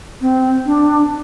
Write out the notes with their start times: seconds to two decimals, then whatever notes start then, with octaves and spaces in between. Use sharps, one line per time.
0.21 C4
0.66 D4